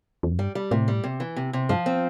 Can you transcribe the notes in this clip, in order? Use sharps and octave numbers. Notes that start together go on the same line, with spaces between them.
E2
F2
G2 G3
G3
A2 C3
G3
C3
E3
C3
C3
G2 F3
C4